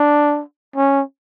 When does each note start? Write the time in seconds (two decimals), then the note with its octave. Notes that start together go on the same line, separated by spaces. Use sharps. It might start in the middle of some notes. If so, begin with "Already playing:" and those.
Already playing: D4
0.76 C#4